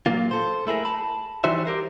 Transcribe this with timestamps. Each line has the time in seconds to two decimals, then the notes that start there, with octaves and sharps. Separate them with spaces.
0.06 A#2 F#3 A#3 F4
0.31 A4 C5
0.67 A3 E4 G#4 A#4
0.85 A5 B5
1.44 E3 G3 D#4 F#4 C5 E5
1.66 G4 A#4 C5